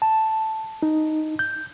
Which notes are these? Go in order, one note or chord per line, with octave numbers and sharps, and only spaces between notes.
A5
D#4
G6